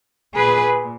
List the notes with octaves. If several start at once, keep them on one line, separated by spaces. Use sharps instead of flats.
A#2 G#4 B4